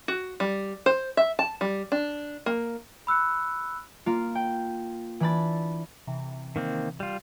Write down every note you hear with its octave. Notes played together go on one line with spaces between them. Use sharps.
F#4
G3
C5
E5
A5
G3
D4
A#3
B5 E6 F#6 C#7
A#3 F4
G5
E3 D4 B5 A6
C3 E3
D#3 A#3 C4
G3 F4